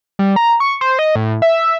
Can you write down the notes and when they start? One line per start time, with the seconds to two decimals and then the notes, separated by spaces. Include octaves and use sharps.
0.19 G3
0.36 A#5
0.60 C#6
0.81 C5
0.99 D#5
1.16 A2
1.42 E5